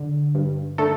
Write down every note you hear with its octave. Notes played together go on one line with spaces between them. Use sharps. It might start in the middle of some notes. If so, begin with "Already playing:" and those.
Already playing: D3
G2
D3 A3 A4